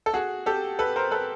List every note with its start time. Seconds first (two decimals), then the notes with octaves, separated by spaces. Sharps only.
0.06 A4
0.14 F#4 G#4
0.46 G4 A4
0.79 A4 B4
0.96 A#4 C5
1.11 A4 B4